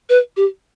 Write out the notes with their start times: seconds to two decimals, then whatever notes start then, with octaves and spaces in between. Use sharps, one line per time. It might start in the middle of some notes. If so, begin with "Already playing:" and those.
0.09 B4
0.37 G4